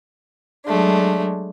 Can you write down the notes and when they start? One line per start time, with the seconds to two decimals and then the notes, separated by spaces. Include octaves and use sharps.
0.66 F#3 G#3 A3 D4